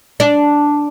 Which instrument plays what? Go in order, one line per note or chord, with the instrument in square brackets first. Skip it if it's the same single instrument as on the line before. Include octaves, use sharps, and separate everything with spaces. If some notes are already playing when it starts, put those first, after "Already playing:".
[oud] D4